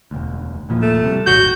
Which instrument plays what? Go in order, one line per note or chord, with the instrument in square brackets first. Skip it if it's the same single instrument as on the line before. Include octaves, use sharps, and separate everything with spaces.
[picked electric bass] E1 D2
D#1 A#2 F3
[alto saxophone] A3
[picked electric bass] C3 G3
[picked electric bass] D#1 G#1 [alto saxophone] F#4 [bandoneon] G6